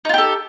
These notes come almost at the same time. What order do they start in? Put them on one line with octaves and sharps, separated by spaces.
D#4 F4 G4 A4